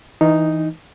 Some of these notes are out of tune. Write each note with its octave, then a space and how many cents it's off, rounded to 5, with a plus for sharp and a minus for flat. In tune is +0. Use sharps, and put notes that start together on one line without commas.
E3 -15 D#4 +0